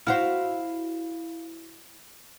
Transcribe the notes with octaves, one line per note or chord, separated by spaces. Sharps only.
E4 F#4 C5 F5